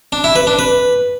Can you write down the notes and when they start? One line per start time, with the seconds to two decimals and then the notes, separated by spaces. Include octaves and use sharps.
0.12 D4
0.24 E4
0.36 B4
0.47 D4
0.59 B4